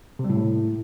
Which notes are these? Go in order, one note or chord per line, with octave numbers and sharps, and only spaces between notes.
C3
G3
A2